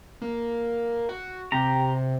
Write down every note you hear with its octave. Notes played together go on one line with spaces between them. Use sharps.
A#3
F#4
C3 G4 A#5